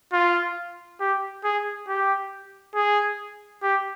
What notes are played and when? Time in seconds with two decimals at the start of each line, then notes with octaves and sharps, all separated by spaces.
0.13 F4
1.00 G4
1.44 G#4
1.88 G4
2.75 G#4
3.63 G4